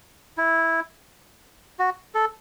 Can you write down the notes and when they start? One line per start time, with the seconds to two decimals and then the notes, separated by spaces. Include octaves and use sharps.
0.38 E4
1.79 F#4
2.15 A4